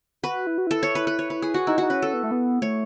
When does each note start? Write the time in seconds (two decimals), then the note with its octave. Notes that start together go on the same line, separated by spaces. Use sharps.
0.23 F#4 B4
0.47 E4
0.58 F#4
0.67 E4 A4
0.83 C#5
0.95 B4
1.07 B4
1.19 C#5
1.30 B4
1.42 G#4
1.54 F#4
1.67 D#4 E4
1.78 D#4 F#4
1.90 C#4 B4
2.02 A4
2.14 B3
2.23 A3
2.31 B3
2.62 A3 C#5